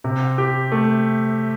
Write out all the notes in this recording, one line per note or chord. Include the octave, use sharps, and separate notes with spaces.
C3
G4
A3